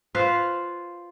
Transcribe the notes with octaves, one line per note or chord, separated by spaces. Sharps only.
F4 B4 C5 F5